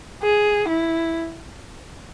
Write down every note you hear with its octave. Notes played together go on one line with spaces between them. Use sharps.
G#4
E4